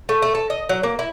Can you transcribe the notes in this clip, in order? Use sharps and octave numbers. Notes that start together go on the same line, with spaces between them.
A3
A3
A4
D#5
F#3
A#3
E4